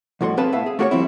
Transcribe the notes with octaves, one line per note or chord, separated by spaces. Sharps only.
C2 F2 A2 F#4 A4 C6
C4 G#4 B4 F5 A5 B5
A2 B3 E5 F5
G#4
A3 A#3 F#4 G#4 C5 C#5
F3 G3 C4 E4